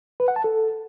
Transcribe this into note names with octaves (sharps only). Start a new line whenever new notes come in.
B4
F#5
A5
A4